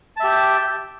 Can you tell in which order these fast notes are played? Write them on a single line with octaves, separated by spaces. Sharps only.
A5 E5 G4 G5